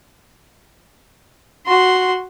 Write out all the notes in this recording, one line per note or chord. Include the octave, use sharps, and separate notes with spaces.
F#4 C6